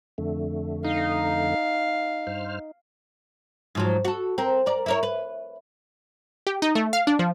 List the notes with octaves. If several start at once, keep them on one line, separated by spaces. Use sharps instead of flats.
F2 D3 A3
D#4 F5
G2 C5 F6
G#2 F3 F#3
F#4 A4
C4 A#4
A#4 D5
E4 A#4 C#5
B4
G4
D#4
A3
F5
D4
F3